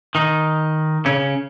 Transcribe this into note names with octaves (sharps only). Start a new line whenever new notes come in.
D#3 D#4
C#3 C#4